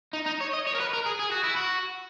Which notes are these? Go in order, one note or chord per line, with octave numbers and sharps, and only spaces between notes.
D#4
D#4
C#5
D#5
C#5
A#4
B4
A#4
G#4
G#4
F#4
E4
F#4